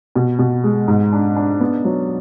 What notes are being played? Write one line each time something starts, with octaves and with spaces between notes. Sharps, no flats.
B2
B2
G#3
G#2
D4
D4
B3
F#3